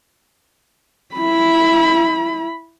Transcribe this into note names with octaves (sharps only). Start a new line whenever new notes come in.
E4 B5